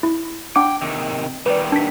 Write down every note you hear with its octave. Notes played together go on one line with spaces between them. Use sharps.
E4
D4 F#5 G5 D6
C3 D#3
D#3 G3 B4 D5
D4 B6